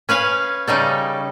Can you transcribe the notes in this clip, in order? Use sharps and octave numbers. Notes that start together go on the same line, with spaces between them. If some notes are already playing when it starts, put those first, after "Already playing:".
C#4 B4 F5 G#5
C#3 G3 D#4 A4